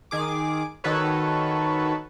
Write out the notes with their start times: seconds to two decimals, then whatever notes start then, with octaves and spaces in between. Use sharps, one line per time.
0.11 D#3 G#4 D6
0.84 D#3 F#4 A4 B4 C#5